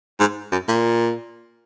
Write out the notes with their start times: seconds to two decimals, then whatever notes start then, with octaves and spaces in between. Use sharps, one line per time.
0.20 G#2
0.52 F#2
0.68 A#2